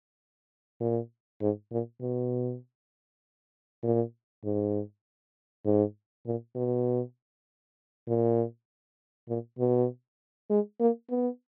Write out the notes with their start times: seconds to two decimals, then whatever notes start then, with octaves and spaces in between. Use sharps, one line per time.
0.80 A#2
1.41 G#2
1.71 A#2
2.02 B2
3.83 A#2
4.44 G#2
5.65 G#2
6.26 A#2
6.55 B2
8.07 A#2
9.29 A#2
9.59 B2
10.50 G#3
10.80 A#3
11.10 B3